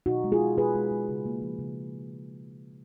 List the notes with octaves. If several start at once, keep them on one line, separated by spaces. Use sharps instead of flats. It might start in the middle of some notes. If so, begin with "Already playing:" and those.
B2 D#4 F#4
G#3
F4 G#4
G#3
B2 G#4 B4
G#3
G#3
C#3
A#3
F3
C#3